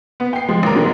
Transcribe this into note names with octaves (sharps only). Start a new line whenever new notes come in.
B3
G5 C7
F3 G#3
A1 A#4
G#2 D3 G#3 A#3